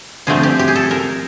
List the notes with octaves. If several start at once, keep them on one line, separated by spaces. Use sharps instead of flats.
D3 F3 A3 C4 G#4
G4
G4
G#4
A4
A#4